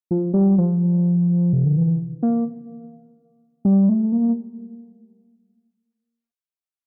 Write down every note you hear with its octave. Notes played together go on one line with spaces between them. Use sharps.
F3
G3
F3
C3
D3
E3
A#3
G3
A3
A#3